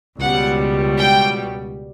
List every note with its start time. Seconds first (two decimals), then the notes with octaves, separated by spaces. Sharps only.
0.20 C#2 B2 G3 F#5
0.98 G5